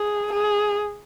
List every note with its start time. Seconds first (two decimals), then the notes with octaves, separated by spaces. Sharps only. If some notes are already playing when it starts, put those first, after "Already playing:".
Already playing: G#4
0.33 G#4